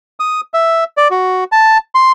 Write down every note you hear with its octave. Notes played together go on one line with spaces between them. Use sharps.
D#6
E5
D5
F#4
A5
C6